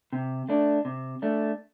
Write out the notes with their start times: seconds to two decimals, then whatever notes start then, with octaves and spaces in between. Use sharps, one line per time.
0.13 C3
0.49 A3 D4
0.85 C3
1.22 A3 D4